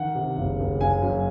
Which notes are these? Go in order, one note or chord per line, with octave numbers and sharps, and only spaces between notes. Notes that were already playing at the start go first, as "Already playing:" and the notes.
Already playing: D#3 F#5
C3
F#1
F#1
F#1 G#5
F#2